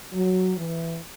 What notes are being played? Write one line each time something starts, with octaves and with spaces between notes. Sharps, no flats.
F#3
E3